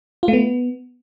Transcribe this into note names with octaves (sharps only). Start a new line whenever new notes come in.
F4
A3
B3